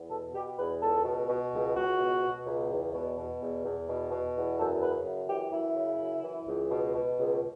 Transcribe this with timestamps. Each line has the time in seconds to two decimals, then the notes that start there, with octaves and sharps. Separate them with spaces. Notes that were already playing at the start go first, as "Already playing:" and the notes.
Already playing: E2
0.10 B2 A4
0.34 B2 G4
0.58 E2 B4
0.81 C#2 A4
1.05 B2
1.29 B2
1.53 C#2
1.75 C#2 F#4
1.99 B2
2.22 B2
2.46 C#2
2.70 E2
2.94 B2
3.17 B2
3.40 E2
3.64 E2
3.88 B2
4.11 B2
4.35 E2
4.59 F#2 A4
4.82 C#3 B4
5.05 F#2
5.29 E3 G4
5.53 F#2 E4
5.76 C#3
6.00 F#2
6.24 E3
6.46 C#2
6.71 B2
6.95 B2
7.18 C#2